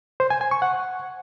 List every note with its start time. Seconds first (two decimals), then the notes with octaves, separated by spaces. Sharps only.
0.20 C5
0.30 G#5
0.41 G#5
0.51 C#6
0.62 F#5